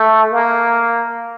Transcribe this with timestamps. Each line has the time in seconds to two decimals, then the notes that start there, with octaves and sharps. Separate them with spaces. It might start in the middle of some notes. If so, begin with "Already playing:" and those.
Already playing: A3
0.32 A#3